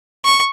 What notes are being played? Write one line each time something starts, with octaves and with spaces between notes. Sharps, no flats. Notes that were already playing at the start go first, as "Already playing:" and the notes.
C#6